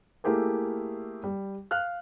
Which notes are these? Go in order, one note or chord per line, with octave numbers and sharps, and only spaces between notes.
A3 A#3 E4 G4 G#4 A#4
G3
F5 F6 F#6